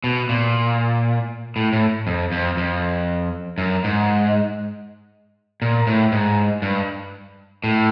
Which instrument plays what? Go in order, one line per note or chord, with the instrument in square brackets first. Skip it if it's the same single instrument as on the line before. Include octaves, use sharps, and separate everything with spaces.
[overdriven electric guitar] B2
A#2
A2
A2
F2
F2
F2
F#2
G#2
A#2
A2
G#2
G2
A2